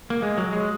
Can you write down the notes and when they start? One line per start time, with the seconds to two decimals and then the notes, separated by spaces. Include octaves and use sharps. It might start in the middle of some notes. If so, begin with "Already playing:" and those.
0.10 A#3
0.22 G#3
0.38 F#3
0.53 G#3